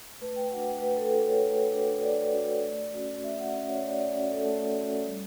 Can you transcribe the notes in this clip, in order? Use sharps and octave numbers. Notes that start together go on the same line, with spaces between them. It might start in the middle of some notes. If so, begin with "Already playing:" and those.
A3 B4
G5
D4 F#4 F#5
G5
A3 B4
A4
D4 F#4 A4
C#5
A3
D4 F#4
A3 D5
D4 F#4
A3
C#4 F#4
A3 E5
F#5
C#4 F#4 E5
C#5
A3 D5
D5
C#4 F#4
A4
A3
C#4 F#4
G3